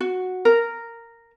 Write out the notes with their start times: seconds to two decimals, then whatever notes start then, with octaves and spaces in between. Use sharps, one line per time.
0.01 F#4
0.45 A#4